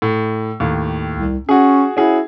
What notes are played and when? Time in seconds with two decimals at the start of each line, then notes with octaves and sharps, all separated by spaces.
0.02 A2
0.60 D#2 A2
1.16 C2
1.49 C#4 F#4 G#4
1.97 C#4 E4 F#4 G#4